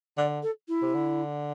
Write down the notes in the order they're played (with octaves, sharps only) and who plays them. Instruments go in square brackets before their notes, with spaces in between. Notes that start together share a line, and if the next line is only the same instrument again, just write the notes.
[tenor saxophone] D3 [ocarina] D5
[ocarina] A4
E4
[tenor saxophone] C3
D3